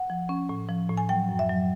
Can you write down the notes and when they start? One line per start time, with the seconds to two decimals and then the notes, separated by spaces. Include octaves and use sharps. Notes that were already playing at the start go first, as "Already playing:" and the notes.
Already playing: F#5
0.10 F3
0.29 C#4
0.49 A2
0.69 F3
0.89 A2
0.97 G#5
1.09 F#3 G5
1.29 F#2
1.39 E5
1.49 F#3